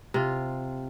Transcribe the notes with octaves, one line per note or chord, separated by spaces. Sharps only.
C3 F4